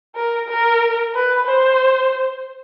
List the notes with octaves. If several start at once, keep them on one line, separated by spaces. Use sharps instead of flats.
A#4
A#4
B4
C5